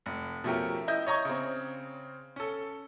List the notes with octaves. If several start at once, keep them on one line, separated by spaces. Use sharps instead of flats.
F1
B2 F3 A3 C#4 G4 A#4
E4 D#5 G6
C#5 D#5 A#5 C#6 G#6
C#3 C4
C#4 A4